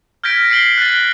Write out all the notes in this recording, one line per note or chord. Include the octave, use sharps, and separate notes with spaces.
F6 G6 G#6 A#6 B6 D7
C7 D7 F#7 G7
F#6 A6